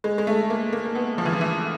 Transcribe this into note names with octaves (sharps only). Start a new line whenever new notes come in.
G#3
G#3
A3
A#3
A#3
A#3
B3
F3
E3
F3
E3